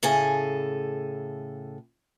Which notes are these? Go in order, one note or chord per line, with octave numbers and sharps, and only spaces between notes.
A2 C#3 G#4 A4 G#5